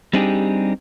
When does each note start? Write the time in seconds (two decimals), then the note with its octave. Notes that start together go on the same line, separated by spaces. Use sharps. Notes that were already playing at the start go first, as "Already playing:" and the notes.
0.13 G3 C4 D4 D#4 G4 G#4